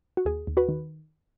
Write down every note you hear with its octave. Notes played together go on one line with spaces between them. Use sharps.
F#4
D#2 G#4
D#2
F#4 B4
D#3